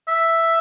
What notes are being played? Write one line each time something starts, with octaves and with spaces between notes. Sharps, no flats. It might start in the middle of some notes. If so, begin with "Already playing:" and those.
E5